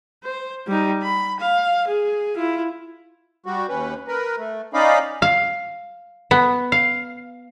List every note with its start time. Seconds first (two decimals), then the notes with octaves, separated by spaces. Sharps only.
0.24 C5
0.67 G3 D#4
1.02 B5
1.40 F5
1.87 G#4
2.37 E4 F4
3.46 G3 F#4
3.69 D#2 C#4 B4
4.07 A#4 B4
4.38 A3
4.74 C#4 D#4 D5 D#5 F5 B5
5.22 F5
6.31 B3
6.72 F5